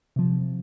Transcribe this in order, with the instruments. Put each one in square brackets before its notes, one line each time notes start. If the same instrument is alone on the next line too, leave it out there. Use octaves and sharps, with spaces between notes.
[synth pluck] C3 F3